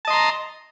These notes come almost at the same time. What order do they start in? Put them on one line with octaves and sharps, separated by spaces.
A5 D#5 C6 A#5